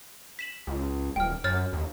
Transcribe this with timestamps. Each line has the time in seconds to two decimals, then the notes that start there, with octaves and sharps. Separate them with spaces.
0.39 B6 E7 F#7
0.67 C#2
1.16 D#1 G5 F6
1.44 F#2 C#5 F6 A6
1.73 D#2